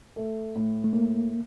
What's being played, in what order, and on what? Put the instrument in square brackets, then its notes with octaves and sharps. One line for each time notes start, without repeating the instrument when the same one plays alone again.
[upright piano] A3
A2
[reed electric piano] A3
[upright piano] A2 [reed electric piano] A#3